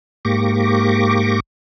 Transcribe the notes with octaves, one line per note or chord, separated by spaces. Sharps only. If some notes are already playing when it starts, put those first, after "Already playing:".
G#2 A#3 G4 C#6 D6 A#6